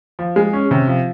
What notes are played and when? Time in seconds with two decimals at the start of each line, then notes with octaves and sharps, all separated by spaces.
0.19 F3
0.36 G#3
0.53 C#4
0.71 C3
0.88 F3